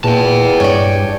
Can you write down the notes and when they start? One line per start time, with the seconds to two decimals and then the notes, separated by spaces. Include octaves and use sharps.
0.04 E2 A#2 G5 A5
0.60 G2 C#5 D5